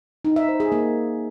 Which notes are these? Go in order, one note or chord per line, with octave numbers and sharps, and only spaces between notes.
D#4
E5
C5
G#4
A#3